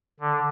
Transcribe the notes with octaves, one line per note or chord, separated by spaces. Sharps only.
D3